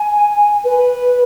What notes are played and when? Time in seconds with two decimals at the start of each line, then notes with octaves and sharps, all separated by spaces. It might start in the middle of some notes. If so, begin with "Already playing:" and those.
Already playing: G#5
0.64 B4